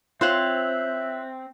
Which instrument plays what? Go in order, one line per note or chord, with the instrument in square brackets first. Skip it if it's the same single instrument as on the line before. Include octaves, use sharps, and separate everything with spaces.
[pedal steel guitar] C4 [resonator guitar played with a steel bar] F4 C5 C#5 [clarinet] E5 [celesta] F#6 F#7